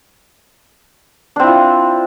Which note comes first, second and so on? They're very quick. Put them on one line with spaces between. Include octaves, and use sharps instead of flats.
D4 C4 E4 F4